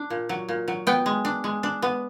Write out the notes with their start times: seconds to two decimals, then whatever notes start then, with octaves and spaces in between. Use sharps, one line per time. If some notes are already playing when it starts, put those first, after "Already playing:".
Already playing: D4
0.10 A#2
0.29 F#3
0.49 A#2
0.68 F#3
0.87 B3 G5
1.06 G#3
1.25 D4
1.44 G#3
1.63 D4
1.82 B3